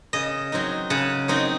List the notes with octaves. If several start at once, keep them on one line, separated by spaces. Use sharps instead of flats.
C#3 D#5
F#3 C4 D#4
C#3 F#5
F#3 C4 D#4